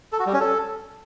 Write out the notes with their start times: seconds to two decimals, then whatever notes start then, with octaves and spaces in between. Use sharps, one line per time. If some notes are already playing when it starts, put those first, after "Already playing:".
0.12 A4
0.19 F#4
0.26 G3
0.33 C#4
0.40 A4